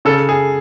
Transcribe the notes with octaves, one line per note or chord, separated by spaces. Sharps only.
C#3 A4
G#4